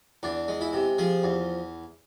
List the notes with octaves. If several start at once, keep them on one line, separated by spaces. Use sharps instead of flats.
E2 D4
G#3
E4
C3
F3 G#4
E2